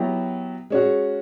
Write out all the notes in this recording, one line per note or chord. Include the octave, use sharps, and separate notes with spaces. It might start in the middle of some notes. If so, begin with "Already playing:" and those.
Already playing: F#3 B3 E4 G4
G#3 C#4 F#4